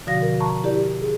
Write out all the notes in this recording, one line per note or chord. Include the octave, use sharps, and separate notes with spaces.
B2 D3 F3 F#4 F5 A#6
A#4
A5 A#5 C#6
E4 G4 A#4 D5
G#4